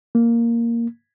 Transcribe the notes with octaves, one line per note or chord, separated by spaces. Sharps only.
A#3